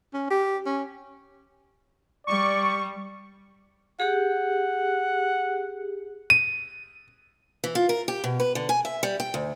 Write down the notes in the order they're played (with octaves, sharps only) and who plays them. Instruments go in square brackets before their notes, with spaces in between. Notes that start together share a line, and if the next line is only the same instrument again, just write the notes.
[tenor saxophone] C#4
G4
C#4
[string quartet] G3 [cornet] D5 [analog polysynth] C#6
[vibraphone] G4 G#4 [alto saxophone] F#5
[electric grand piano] D#7
[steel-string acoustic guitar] E3
F4
A#4
G4
B2
B4
D3
G#5
E5
G3
G5
D2